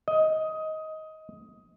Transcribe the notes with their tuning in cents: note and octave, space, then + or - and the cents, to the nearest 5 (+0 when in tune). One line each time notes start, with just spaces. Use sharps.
D#5 +15